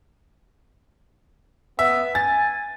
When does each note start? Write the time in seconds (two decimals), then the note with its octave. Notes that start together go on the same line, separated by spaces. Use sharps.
1.79 B3 E5
2.15 G#5 A6